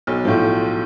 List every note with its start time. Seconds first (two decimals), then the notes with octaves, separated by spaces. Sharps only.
0.07 B1
0.24 A2 F3